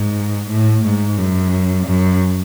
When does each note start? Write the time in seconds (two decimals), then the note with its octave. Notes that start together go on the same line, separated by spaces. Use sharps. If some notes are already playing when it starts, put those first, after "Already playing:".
Already playing: G#2
0.50 A2
0.85 G#2
1.18 F#2
1.86 F#2